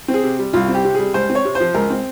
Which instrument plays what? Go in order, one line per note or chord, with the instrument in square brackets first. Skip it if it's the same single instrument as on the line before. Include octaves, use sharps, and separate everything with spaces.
[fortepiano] C4
G#4
C3
G3
C2 F4
C4
G4
C3
G3 G#4
C#2 C5
C4
C#5
C3
F3 C5
C#2 A#4
C4